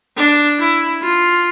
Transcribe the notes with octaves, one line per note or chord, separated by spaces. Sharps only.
D4
E4
F4